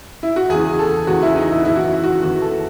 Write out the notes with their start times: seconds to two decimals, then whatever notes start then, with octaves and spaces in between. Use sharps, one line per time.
0.23 E4
0.36 F#4
0.49 E2 C#3 E3 G#4
0.79 A4
1.07 E2 C#3 E3 F#4
1.22 E4
1.36 D#4
1.51 E4
1.65 F#2 E3 E4
1.76 F#4
1.84 E4
2.04 F#4
2.22 F#2 E3 F#4
2.42 A4